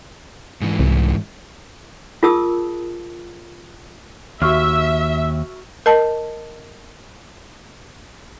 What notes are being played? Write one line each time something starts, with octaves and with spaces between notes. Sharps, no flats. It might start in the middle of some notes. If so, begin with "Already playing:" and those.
G#2 E3
C2
F4 G#4 A#4 A5 D#6 E6
D#2 F#4 E5 C#6 F6
A#4 D#5 A5